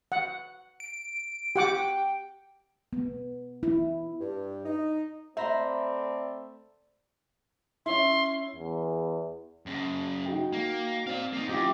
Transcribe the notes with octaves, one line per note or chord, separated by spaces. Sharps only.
F#5
D7
G4 F#5 G5 D6
B3
E4
G2
D#4
A3 C4 C5 D5 E5 A#5 B5
C#4 E4 C6
E2
F#2 C#3
D#4 F#4 G5
A#3
C4 D5 F5
A#3 D#4
F#2 E4 F4 G4